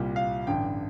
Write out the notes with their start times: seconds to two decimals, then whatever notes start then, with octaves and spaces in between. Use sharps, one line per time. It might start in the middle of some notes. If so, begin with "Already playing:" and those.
Already playing: C2 A#2 G3
0.16 F5
0.47 A1 G2 D3 G5